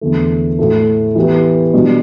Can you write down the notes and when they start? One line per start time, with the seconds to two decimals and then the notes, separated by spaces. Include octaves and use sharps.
0.01 E2 D3 A3
0.59 A2 A3 E4 A4
1.15 E3 B3 G4 B4
1.74 B2 G3 D4